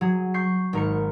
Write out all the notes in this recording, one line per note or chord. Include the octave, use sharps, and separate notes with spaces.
F#3 G#4
C#6 G6 C7
G#1 A#4 C#7